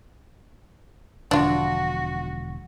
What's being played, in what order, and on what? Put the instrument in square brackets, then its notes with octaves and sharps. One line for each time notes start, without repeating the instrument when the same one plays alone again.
[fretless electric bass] E1 D3 F3 [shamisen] D4 F4 [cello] F#4